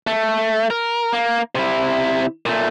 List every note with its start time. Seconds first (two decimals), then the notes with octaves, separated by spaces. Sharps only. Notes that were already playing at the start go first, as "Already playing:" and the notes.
0.07 A3
0.70 A#4
1.13 A#3
1.55 C3 E4
2.46 A#2 A3